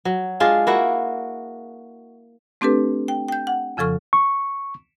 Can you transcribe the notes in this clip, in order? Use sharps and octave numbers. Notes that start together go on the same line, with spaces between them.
F#3
G#3 D4 F4 G#4
A#3 E4 F#4
A3 C4 D4 G4 A4 B4
G5
G5 G6
F#5
F2 C#3 F3 A4 C#6 F6
C#6